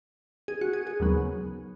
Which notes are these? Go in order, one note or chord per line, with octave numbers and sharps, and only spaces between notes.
G#4
F#4
G#4
G#4
D#2 C#3 F#3 B3